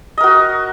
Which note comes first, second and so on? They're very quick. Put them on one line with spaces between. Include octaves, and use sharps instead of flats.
D#5 A#4 F#4